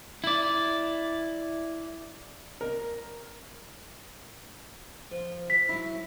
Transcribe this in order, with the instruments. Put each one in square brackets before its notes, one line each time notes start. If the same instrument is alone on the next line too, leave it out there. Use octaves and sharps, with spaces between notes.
[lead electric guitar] E4 D5
[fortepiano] A#4
[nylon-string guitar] F3
[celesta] B6
[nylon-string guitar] F#3 E4